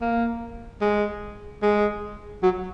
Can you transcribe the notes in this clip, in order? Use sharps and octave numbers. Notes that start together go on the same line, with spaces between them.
A#3
G#3
G#3
F#3